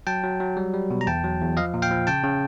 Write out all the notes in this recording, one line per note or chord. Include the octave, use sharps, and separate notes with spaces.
F#3 G5 A5
F#3
F#3
G3
G3
B2
A#5
E2 G5 A5
F#3
E2
F3 D#5 F5
A#2
F5 G5
F3
C#3 G5 A5
C#3